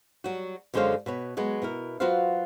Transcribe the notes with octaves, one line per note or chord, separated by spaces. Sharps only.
F#3 G3 F#4
F#2 D3 G#3 C5 C#5 F5
B2 B4 C#5
F#3 G#3 B3
B2 E4 A#4
F#3 F4 F#4 B4 C5 F5